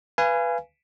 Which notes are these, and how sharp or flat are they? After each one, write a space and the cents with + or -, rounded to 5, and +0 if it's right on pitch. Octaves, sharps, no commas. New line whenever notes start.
B4 +0 F5 -35 G#5 +0